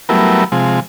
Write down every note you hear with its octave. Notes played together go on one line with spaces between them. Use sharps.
F#3 G3 A3 B3 E4 A#4
C3 F3 G#3